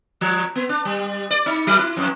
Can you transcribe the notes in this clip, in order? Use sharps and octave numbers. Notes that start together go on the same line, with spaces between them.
F3
B3
D4
G3
D5
D#4
F#3
E4
F2